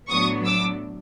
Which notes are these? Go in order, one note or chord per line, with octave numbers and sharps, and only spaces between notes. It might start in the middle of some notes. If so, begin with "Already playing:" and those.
A2 F#3 B3 D4 C#6 D#6
D6 E6